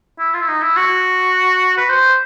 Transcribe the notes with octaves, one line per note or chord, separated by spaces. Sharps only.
E4
F4
E4
D#4
E4
F#4
B4
C5